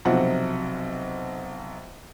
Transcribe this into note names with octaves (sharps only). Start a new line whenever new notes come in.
B1 C3 F3 F#3 F#5